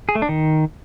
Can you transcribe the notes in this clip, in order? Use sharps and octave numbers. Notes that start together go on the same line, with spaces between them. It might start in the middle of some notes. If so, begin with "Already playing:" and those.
G#4
A3
D4
D#3